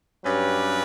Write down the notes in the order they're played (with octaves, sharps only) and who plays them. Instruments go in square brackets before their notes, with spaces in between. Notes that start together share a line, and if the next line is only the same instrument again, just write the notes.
[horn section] G2 F#3 C#4 G4 B4